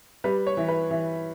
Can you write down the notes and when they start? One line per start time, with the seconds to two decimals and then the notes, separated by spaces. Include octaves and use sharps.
0.24 G3 B4
0.47 C#5
0.57 E3
0.68 B4
0.91 E3